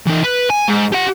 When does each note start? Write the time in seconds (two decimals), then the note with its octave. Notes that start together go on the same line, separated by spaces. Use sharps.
0.06 E3 D#4
0.24 B4
0.50 G#5
0.68 G#2
0.93 G4 F#5